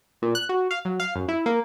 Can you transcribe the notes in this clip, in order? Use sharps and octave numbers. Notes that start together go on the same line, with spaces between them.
A#2
F#6
F#4
F5
F#3
F5
F#2
E4
A#3